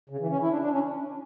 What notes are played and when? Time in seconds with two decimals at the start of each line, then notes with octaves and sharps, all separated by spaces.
0.09 C#3
0.20 E3
0.30 C#4
0.41 E4
0.51 D4
0.62 D4
0.72 C#4